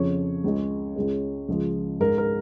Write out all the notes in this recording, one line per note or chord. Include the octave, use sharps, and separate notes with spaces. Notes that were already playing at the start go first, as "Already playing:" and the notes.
Already playing: F2 C#3 F3 C#5
C#2 C#3 G#3
C#2 C#3 G#3
C#2 C#3 F3 G#3
G#2 G#3 A#4
A#4